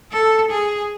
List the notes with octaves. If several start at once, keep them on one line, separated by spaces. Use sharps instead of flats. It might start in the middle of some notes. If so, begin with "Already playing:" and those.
A4
G#4